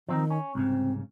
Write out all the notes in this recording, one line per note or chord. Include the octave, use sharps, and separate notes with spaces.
D#3 F3 C4 D#4
C#4
C2 G#2 C#3 C4